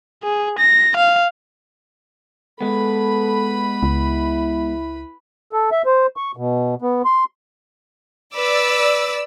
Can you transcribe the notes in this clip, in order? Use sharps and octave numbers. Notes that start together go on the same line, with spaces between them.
G#4
A#6
F5
G#3 B3 A4 B4 B5
C#2 E4
A4
E5
C5
C#6
B2
B3
C6
B4 D5 D6 E6